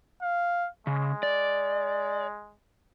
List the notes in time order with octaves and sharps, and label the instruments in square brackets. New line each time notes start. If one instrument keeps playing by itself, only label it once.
[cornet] F5
[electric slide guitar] C#3 [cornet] G#3
[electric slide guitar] D5